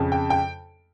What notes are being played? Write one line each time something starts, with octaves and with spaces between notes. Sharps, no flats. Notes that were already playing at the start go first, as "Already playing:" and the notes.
Already playing: F2 C#3
G5
G5